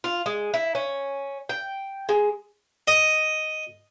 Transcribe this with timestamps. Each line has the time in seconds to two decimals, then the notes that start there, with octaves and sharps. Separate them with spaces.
0.04 F4
0.26 G#3
0.54 E4
0.75 C#4
1.49 G5
2.09 G#3
2.88 D#5